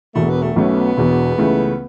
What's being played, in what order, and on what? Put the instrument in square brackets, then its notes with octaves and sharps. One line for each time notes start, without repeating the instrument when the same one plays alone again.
[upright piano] E1 E2 B2 [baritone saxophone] A3
[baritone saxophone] B3
A3
[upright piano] B1 B2 A3 C#4 [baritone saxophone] B3
[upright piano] E1 E2 B2
C#2 C#3 E3 A3